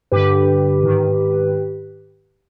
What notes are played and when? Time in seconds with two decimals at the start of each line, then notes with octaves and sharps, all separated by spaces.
0.12 G2 D3 G4 B4
0.83 G#2 D#3